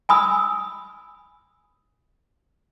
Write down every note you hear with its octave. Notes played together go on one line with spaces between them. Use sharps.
G#5 B5 D#6 E6